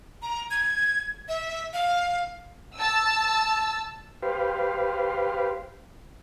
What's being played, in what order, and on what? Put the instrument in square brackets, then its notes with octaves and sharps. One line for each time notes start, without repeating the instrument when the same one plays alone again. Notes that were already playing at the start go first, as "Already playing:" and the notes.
[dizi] A#5
G#6
E5
F5
[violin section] A5 E6
[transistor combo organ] G4 B4 C5 F5